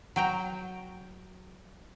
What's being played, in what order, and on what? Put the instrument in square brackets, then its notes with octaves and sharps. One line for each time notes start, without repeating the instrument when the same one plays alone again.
[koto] F#3 G5 A#5